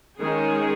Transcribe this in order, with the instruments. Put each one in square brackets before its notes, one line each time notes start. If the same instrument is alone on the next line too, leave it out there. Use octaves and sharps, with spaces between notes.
[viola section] D#3 G#3 C#4 G#4